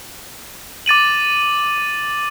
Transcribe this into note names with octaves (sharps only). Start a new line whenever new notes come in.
D6 A6 D#7 F#7